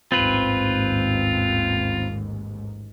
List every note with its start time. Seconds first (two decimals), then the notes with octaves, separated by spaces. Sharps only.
0.12 A1 D#2 G#2 C4 F4 B4